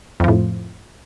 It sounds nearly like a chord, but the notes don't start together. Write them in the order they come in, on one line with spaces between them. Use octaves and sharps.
F2 F3 A2